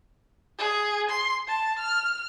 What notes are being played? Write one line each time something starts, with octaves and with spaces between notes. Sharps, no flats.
G#4
C6
A5
F6